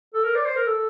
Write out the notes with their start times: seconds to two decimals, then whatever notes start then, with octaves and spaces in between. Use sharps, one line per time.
0.14 A4
0.24 A#4
0.35 D5
0.45 C5
0.56 A#4
0.66 A4